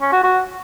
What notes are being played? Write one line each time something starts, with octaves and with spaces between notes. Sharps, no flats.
C#4
F#4
F#4